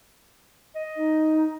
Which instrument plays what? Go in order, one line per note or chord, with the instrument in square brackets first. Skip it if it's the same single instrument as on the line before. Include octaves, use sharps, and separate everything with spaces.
[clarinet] D#5
[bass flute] D#4